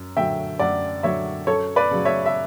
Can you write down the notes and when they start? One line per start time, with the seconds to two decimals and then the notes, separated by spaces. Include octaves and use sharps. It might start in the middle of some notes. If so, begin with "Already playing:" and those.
Already playing: F#2
0.17 D3 F#3 E5 G5
0.59 F#2 D5 F#5
1.03 D3 F#3 C#5 E5
1.47 F#2 A4 C#5
1.76 B4 D5
1.91 C#3 F#3
2.05 C#5 E5
2.26 E5